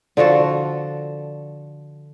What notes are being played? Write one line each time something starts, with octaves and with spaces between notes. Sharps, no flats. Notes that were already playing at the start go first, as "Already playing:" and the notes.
D3 F3 F#4 A4